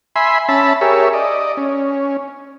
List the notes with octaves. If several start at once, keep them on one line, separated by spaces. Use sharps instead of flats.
E5 G#5 B5 C6
C#4 E5 A5 B5
G4 G#4 A#4 C#5 E5
D5 D#5
C#4